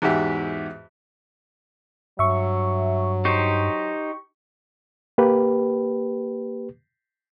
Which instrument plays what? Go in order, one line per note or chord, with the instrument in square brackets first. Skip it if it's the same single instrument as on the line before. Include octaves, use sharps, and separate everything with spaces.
[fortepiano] E2 G#2 F#4 G4 E5
[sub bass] G2 [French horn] F#3 [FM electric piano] E5 C#6
[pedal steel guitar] D#4 G4 C5 [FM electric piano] C#6
[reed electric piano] A#3 G4 B4